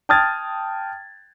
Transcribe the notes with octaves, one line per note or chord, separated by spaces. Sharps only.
G5 A5 D#6 F6 G#6 A6